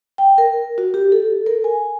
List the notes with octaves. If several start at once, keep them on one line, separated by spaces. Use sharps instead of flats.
G5
A#4
F#4
G4
A4
A#4
G#5